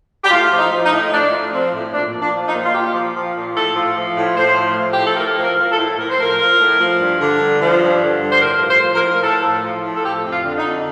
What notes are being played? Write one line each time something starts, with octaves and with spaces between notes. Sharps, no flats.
G4
A2 F4
F3
D#4
F3
D#4
A2
A2 D4
F3
F3 C4
A2
A#2 D4
F3
D4
F3
D#4
A#2
F4
A#2 G4
F3
F3
A#2
A2 A4
F3
F3
A2
A2 C5
F3
F3
G4
A2
A4
A2 A#4
F3
A#4
F3
A4
A2
A2 A#4
C5
F3 A#4
F3
A2
F3
G2
D3
G2
F3
G2
D3
G2
C5
A2 A#4
F3
C5
F3
A#4
A2
A#4
A2 A4
F3
F3
A2
A4
F3 G4
F2
F4
D3
D#4
F2